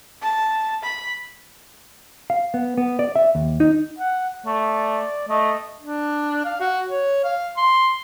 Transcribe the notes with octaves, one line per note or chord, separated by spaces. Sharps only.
A5
B5
F5
B3
B3
D5
E5
D#2
D#4
F#5
A3 D5
A3 D#5
D4
F5
F#4
C#5
F5
C6